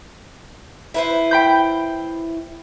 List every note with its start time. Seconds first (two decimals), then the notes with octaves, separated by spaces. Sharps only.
0.94 E4 B4 C5
1.31 G5 B5 G6